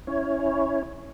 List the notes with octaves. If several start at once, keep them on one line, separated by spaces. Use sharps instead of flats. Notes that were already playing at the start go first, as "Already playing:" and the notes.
C#4 E4 C#5